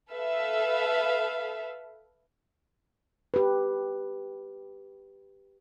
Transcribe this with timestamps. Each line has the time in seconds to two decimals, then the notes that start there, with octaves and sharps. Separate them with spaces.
0.12 A4 B4 E5 F5
3.34 G4 B4